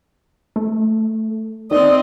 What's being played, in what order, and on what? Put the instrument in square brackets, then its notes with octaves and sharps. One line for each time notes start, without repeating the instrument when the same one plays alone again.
[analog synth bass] A3
[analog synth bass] D#3 [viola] C4 D#5 [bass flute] D5